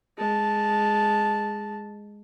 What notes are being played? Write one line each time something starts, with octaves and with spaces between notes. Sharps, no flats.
G#3 A5